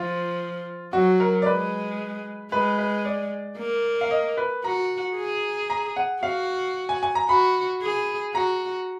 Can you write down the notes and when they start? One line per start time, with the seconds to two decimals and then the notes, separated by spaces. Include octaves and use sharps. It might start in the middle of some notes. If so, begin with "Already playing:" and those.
Already playing: F3 F4
0.93 F#3 F#4
1.20 A#4
1.42 D5
1.46 G#3 B4
2.52 G#3 B4
2.79 B4
3.05 D5
3.58 A#3
4.01 F5
4.11 D#5
4.37 B4
4.64 F#4 A#5
5.17 G#4
5.70 A#5
5.96 F#5
6.23 F#4 F5
6.89 G#5
7.03 G#5
7.15 A#5
7.29 F#4 B5
7.82 G#4
8.35 F#4 A#5